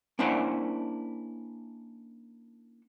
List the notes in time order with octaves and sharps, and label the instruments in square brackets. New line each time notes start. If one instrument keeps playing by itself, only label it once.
[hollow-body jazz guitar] A#3 C#4 D4 E4 C5 F#5